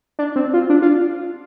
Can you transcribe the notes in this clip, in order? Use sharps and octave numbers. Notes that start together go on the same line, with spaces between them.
D4
C4
F4
D4
F4